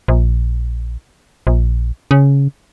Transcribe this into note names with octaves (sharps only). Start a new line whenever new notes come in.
A#1
A#1
C#3